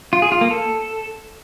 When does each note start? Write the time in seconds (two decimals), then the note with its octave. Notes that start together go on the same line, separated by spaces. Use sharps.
0.13 F4
0.22 G#4
0.32 F4
0.41 A#3
0.51 A4